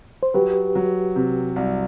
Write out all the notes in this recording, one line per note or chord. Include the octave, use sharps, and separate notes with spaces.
C5
F#3 G4 B4
F#3
C3
C2